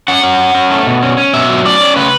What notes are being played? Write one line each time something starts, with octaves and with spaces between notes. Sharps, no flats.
C#4 F#5
C#4
F#3
C#4
A3
B2
C#4
C#4
B2 E5
F#3
C#4 D5
C#4
C#3 B4